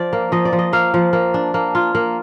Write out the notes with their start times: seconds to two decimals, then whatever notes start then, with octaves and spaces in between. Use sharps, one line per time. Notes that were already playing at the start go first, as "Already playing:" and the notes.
Already playing: F3 D5
0.13 A#3
0.32 F3 D#5
0.45 D5
0.53 F3
0.59 D#5
0.73 A#3 F5
0.94 F3
1.13 A#3
1.34 D4
1.54 A#3
1.75 F4
1.95 A#3